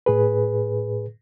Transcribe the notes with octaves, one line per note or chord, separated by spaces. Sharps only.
A2 G#4 B4